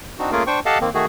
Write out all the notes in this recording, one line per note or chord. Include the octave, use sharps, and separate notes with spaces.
C4 D4 D#4 F#4
A3 A#3 C#4 F4 G#4 A#4
D4 C5 G5 C#6
G4 A4 D#5 F5 F#5 A5
D#3 A#3 C4
D#3 A3 F#4 G#4